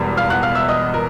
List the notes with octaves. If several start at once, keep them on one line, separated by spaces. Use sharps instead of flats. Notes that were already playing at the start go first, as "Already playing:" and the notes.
Already playing: E1 E2 B2 G3
F5 F6
F#5 F#6
F5 F6
E5 E6
D#5 D#6
A#4